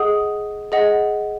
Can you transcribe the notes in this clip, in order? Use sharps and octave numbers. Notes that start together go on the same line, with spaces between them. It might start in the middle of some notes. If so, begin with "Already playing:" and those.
Already playing: G#4 D#5 F#5 D#6
G#4 D#5 F#5